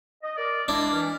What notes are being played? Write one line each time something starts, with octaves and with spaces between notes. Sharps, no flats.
D#5
A#4 D5
G#3 A#3 D4 E4
E3 F6